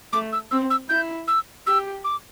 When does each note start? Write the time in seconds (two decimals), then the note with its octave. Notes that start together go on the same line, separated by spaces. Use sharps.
0.13 A3 D6
0.33 E6
0.51 C4 E6
0.70 E6
0.89 E4 G6
1.28 E6
1.66 G4 E6
2.04 D6